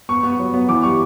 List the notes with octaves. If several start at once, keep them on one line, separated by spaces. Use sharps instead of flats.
B3 C#6
B3
F#3
B3
E3 D6
G3 C#6